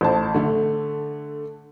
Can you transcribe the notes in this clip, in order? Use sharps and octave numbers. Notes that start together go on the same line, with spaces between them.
A1 C5 A5
D3 A3